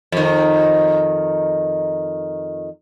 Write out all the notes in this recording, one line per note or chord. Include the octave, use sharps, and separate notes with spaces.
F2 D#3